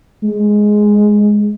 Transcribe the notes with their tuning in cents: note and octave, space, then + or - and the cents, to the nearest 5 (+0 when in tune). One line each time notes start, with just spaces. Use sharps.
G#3 +5